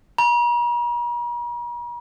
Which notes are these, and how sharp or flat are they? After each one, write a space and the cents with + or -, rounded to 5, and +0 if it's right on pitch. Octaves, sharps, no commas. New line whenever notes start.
A#5 +45